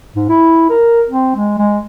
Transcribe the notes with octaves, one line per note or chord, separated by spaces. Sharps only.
G#2
E4
A#4
C4
G#3
G#3